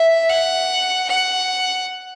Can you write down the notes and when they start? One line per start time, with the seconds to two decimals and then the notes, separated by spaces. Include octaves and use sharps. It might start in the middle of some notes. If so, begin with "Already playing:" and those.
Already playing: E5
0.29 F#5
1.08 F#5